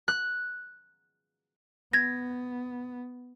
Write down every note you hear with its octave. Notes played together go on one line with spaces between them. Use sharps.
F#6
B3 G#6 A#6